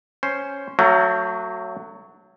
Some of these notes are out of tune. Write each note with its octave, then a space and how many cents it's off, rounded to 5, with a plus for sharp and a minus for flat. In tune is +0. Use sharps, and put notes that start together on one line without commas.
C#4 +0 C5 +5
F#3 +0 A3 +35 F#4 +0